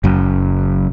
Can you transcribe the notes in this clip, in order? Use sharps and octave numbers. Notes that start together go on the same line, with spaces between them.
F#1 F#2